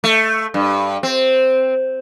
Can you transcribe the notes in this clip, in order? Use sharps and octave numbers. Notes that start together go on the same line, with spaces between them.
A3
G2
C4